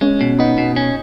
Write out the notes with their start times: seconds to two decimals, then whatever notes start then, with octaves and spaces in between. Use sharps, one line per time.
0.01 G#3 C#4
0.21 B2
0.39 B3 D#4
0.58 B2
0.76 C#4